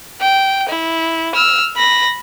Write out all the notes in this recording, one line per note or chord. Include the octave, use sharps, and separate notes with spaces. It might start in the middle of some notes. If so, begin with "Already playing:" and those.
G5
E4
E6 F6
B5 A#6